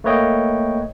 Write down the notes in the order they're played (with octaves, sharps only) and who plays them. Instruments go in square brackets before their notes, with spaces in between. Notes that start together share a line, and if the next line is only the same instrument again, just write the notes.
[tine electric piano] A3 A#3 B4 C#5 D#5 G5